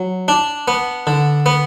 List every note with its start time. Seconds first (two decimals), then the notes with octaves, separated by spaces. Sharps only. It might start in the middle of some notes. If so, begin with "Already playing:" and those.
Already playing: F#3
0.28 D4
0.68 B3
1.07 D3
1.46 B3